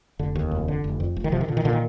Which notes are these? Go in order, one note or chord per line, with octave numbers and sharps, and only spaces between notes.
F1 D3
D#2
F1
D3
F1
F2
F1
D#3
C3 F3
D#3
A#2 D3
D#3
A#2 D3
D#3